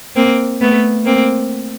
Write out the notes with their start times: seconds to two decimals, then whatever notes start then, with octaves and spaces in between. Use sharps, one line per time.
0.16 A#3 C4
0.61 A3 B3
1.05 A#3 C4